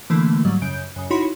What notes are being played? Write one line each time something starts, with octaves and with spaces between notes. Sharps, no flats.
D3 E3 A3 A#3
G#2 F#3 G3
F#2 C#3 G6 D7
F#2 C#3
D#4 E4 F#4 C#5 B5 C6